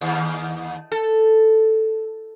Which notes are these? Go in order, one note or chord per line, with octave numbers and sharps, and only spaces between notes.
D#2
A4